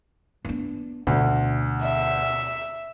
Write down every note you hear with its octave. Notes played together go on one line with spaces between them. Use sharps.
B3 D4
D2 B2
E5